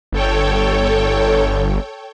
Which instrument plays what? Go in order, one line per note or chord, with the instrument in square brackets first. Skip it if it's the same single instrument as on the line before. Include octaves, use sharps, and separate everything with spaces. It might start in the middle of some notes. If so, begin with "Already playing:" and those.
[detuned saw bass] G1 [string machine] A4 C#5 G5